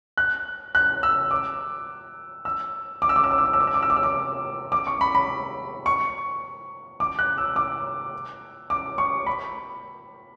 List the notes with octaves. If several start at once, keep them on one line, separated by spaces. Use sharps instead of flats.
F#6
F#6
E6
D6
E6
D6
E6
D6
E6
D6
E6
D6
E6
D6
E6
D6
E6
D6
E6
D6
D6
C#6
B5
B5
C#6
D6
F#6
E6
D6
D6
C#6
B5